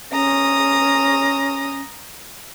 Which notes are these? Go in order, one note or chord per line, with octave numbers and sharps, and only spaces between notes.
C#4 A#5 D#6